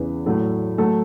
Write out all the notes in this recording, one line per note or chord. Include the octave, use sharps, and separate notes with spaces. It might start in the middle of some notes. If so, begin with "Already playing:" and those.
Already playing: E2 C#3 E3 B4
A2 F#3 A3
F#3 A3 A4